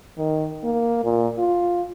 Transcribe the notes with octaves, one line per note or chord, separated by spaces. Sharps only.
D#3
A#3
A#2
F4